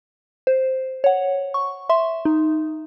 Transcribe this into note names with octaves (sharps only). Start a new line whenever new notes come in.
C5
C#5 F#5
C#6
E5 C6
D#4